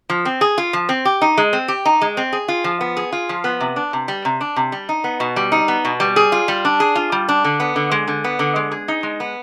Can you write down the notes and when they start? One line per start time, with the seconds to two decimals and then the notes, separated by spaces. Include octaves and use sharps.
0.10 F3
0.25 C4
0.41 G#4
0.58 F4
0.73 F3
0.89 C4
1.05 G4
1.22 D#4
1.38 G#3
1.53 C4
1.68 G4
1.85 D#4
2.02 G#3
2.17 C4
2.33 G#4
2.48 F4
2.64 F3
2.81 B3
2.97 G#4
3.12 F4
3.29 F3
3.44 B3
3.61 C3
3.76 D4
3.93 C3
4.08 G3
4.25 C3
4.41 D4
4.57 C3
4.72 G3
4.89 D#4
5.04 B3
5.20 B2
5.36 G3
5.52 D#4
5.68 B3
5.85 B2
6.00 G3
6.16 G#4
6.32 F4
6.48 G3
6.65 D4
6.80 G#4
6.95 F4
7.12 G3
7.29 D4
7.45 D3
7.60 B3
7.76 D3
7.92 G#3
8.08 D3
8.24 B3
8.39 D3
8.56 G#3
8.72 G#4
8.88 D#4
9.03 G#3
9.20 B3